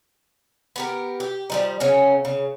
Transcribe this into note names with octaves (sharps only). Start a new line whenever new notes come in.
B3 G4 A#4
G4
F3 G3 D#4
C#3 F#3 C#4 A#4
C#3